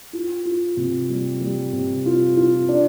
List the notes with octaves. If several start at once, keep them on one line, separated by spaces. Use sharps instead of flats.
F4
F4
C3
G3
G3
C3
F4
F4
D4